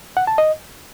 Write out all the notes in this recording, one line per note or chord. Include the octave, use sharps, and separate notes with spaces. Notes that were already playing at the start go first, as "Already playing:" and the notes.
F#5
A5
D#5